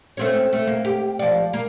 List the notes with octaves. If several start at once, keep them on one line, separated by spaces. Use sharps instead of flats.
A3 C4 C#4
A3
A#3
G4
F3 D5
A#3